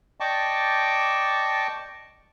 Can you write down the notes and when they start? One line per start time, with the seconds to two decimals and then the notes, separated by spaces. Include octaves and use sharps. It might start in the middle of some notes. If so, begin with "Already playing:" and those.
0.20 D5 D#5 G5 A5 C#6 D6